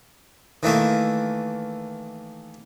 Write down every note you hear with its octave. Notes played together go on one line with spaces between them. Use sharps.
D#3 E3 A3 A#3